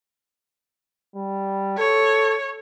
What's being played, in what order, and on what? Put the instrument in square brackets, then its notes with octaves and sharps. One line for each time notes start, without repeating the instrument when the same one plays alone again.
[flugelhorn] G3
[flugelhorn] A4 [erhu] C#5